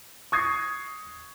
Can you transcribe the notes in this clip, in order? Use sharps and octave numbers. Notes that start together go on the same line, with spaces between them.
C#6 D#6 G#6 A#6 C7